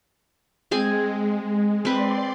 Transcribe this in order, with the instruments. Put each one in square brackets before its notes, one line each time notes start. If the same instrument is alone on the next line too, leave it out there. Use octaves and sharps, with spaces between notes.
[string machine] G#3 [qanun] C4 G#4 G#5
[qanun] C4 B4 [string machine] D5 C6